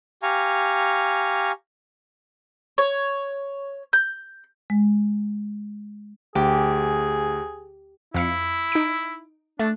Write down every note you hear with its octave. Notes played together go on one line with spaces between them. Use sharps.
G4 F5 G#5 A#5 C#6
C#5
G6
G#3
D2 G4 G#4
F2 E4 F5 C#7
D#4 D7
A3 D4